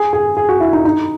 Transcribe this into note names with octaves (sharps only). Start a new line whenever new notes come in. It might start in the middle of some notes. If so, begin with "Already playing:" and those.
Already playing: G#4
G#4
G#4
F#4
E4
D#4
D#4